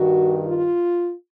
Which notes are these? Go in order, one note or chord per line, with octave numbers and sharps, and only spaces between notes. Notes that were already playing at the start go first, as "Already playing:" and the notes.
Already playing: G2 D#3 F#4
F4